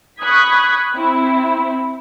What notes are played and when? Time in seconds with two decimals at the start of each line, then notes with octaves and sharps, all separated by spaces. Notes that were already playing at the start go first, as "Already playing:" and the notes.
0.21 B5 C#6 D#6 F#6 G#6 B6
0.95 C4 E4